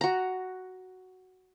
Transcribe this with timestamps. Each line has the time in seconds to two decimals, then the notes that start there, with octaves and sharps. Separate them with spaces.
0.01 F#4 A#5